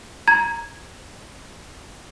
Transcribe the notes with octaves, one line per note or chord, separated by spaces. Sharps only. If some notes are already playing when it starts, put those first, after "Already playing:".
A#5 G#6